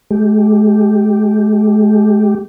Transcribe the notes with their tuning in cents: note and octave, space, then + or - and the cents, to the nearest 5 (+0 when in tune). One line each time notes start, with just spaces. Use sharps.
G#3 +40 G4 +0